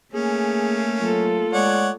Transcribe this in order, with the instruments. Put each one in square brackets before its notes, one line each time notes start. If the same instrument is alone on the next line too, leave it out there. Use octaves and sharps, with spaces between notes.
[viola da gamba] A3 A#3 [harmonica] C#4 [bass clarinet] G#4
[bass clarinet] F#3 [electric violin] F4 A4
[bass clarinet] G#3 [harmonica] C#5 D5 F#5